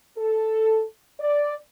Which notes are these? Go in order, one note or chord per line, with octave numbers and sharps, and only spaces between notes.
A4
D5